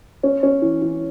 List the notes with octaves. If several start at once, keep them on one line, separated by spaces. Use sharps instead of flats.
C#4
C#4
E3
E3